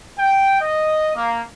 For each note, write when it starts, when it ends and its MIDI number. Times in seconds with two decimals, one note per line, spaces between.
0.19 0.61 79
0.62 1.11 75
1.16 1.42 58